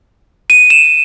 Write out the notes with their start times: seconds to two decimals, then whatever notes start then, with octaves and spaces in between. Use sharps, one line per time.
0.50 D#7
0.70 E7